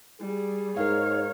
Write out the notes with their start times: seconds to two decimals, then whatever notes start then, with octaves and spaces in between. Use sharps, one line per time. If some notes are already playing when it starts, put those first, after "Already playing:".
0.20 G3 G#4
0.77 G#2 A#4 C#5 F5